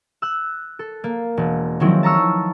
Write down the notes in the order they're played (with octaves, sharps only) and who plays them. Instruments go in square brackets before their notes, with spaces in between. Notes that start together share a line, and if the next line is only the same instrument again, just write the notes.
[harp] E6 F#6
A4
A#3
E1
D#3 F3 F#3 G#3 C4 E4
A5 A#5 C#6 E6 F6